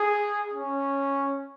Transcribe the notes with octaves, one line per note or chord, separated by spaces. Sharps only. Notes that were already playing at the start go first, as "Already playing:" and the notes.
Already playing: G#4
C#4